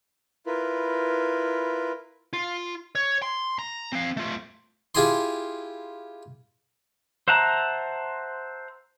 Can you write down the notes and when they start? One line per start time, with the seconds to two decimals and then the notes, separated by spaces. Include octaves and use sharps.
0.46 E4 F4 A#4 B4
2.33 F4
2.95 C#5
3.22 C6
3.59 A#5
3.92 C4 F5
4.17 A3 F4
4.95 E4 F4 G4 G#4 G#5 C6
7.28 C5 E5 F#5 A5 A#5